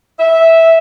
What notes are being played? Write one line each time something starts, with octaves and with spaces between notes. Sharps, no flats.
E5